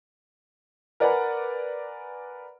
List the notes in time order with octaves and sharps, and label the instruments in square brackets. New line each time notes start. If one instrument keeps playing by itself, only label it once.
[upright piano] A#4 B4 D5 F#5 G#5 B5